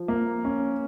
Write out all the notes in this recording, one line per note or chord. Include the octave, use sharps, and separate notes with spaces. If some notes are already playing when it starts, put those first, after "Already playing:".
Already playing: F3
A#3
C#4